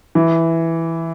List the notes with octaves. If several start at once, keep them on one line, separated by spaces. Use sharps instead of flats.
E3